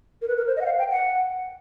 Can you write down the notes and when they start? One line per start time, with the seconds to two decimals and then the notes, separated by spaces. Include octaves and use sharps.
0.22 A#4
0.28 B4
0.37 A#4
0.47 C5
0.56 D#5
0.61 F#5
0.65 F5
0.79 G5
0.91 F#5